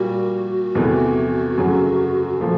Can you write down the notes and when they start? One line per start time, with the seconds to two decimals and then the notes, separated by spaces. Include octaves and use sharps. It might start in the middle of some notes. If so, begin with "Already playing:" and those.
Already playing: A#2 G3 A#3 F#4
0.75 E2 C3 E3 A3
1.57 F#2 C#3 F#3 A3
2.40 A#2 F3 A3